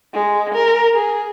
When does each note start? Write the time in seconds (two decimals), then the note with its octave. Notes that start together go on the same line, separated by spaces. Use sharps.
0.13 G#3
0.55 A#4
0.94 G#4